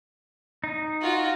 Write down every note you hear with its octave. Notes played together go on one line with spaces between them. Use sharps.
D#4
F4 F#4